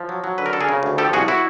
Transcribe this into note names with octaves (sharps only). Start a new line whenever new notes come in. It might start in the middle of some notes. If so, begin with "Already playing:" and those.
Already playing: F3
F#3
F#3
D3 B4
A#4
D3 A4
G#4 A#4
C#3
D2
F3 G4 A4
C2 F#4 G#4
E4 F#4